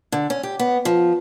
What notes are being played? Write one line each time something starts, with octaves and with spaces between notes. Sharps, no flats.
D3
C#4
G4
B3
F3